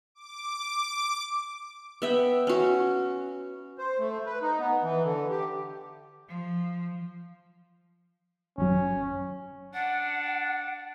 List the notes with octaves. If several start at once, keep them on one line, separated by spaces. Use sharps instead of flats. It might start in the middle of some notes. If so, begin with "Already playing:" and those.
D6
B3 E5 G5
C#4 F#4
C5
A3
B4
D#4
B3
E3
D3
G4
F3
G#1 F#2 C#4
D4 F#5